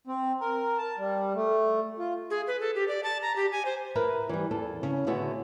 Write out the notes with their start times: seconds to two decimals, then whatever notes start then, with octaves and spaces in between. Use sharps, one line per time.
0.07 C4
0.40 A#4
0.78 A5
0.98 G3
1.35 A3
1.99 F4
2.30 G#4
2.47 B4
2.61 A4
2.75 G4
2.88 D5
3.03 A5
3.22 A#5
3.36 G4
3.52 G#5
3.65 C5
3.95 E4 A#4 B4
4.29 E3 G3
4.51 E2 A4
4.83 C#3
5.07 A2 D3 B3 F#4 G#4 E5